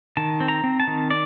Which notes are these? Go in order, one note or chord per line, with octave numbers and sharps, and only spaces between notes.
D#3 A5
C4
A#5
C4
A5
D#3
D5